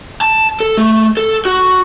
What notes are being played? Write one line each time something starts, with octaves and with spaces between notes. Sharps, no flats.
A5
A4
A3
A4
F#4